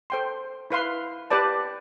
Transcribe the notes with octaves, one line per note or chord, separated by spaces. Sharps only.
A4 C5 G5 C6
E4 B4 F5 C6
G4 B4 D5 A5